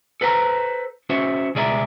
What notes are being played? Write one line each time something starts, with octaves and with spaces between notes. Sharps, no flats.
A4 B4 C5 G5 A#5
C#4 F#4 C5 E5
C#2 B2 G#4 D5 E5 A#5